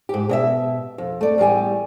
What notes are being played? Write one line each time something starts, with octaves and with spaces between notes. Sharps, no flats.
G#2 G4
B2 D#5 E5
F2
A3 D5
E2 A2 G3 G#5